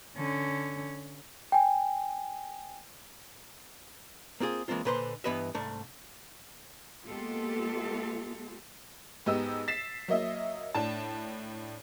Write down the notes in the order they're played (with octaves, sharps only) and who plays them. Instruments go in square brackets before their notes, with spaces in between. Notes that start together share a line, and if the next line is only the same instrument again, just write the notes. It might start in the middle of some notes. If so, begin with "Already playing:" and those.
[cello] D3 C#4
[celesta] G5 G#5
[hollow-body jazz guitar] A#3 C4 F4 G#4
E3 G#3 A#3 C4 F4
A#2 D3 B4 C5 C6
G2 E3 B3 B4 D#5 E5
C2 G#2 A3 D4
[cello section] G#3 A#3 B3 F4 G4 A4
[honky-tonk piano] G#2 B3 G4 D#5 E6
A6 B6 C7 E7
F#3 A#3 D#5 E5
A2 D4 A5